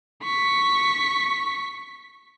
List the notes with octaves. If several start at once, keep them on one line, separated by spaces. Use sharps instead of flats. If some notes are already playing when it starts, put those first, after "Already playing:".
C#6 B6